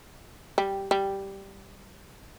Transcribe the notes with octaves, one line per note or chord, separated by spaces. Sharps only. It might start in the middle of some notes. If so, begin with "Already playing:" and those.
G3
G3